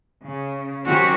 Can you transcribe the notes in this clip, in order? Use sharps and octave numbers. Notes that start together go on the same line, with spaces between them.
C#3
D#3 F#3 C4 C#4 F#4 G4